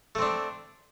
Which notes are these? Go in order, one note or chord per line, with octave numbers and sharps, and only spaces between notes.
A3 C4 D4